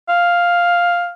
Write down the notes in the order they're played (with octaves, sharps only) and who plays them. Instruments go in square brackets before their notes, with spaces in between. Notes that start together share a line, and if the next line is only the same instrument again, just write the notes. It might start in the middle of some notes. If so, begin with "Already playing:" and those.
[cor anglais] F5